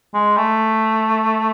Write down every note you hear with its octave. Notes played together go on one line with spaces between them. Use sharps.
G#3
A3